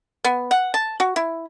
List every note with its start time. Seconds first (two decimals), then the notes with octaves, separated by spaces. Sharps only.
0.24 B3
0.51 F#5
0.74 A5
1.00 F#4
1.16 E4